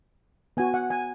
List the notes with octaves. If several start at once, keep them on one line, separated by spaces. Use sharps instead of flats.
B3 F#4 G#5
F#5
G#5